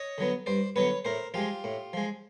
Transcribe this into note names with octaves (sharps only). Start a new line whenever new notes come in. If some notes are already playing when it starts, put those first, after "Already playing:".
Already playing: C#5 D#5
D3 F#3 B3
G2 C5 D5
D3 F#3 B3 B4 C#5
A2 A#4 C5
F3 G#3 F4 G4
A2
F3 G#3